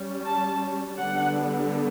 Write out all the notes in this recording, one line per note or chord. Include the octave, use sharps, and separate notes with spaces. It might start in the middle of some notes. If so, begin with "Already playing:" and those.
Already playing: G3 C#4
A5
D3 G3 B3 D4 F#5